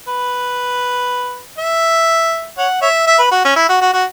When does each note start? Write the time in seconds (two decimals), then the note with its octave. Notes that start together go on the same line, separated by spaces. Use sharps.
0.08 B4
1.58 E5
2.58 C#5 F#5
2.81 C#5 E5
3.07 E5
3.19 B4
3.31 F#4
3.44 C#4
3.56 E4
3.69 F#4
3.81 F#4
3.93 F#4